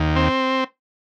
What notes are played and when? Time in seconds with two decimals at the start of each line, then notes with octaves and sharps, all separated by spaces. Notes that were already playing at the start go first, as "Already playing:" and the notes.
Already playing: D#2
0.16 C4